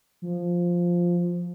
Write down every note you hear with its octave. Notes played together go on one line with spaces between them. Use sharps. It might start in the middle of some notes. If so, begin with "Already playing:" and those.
F3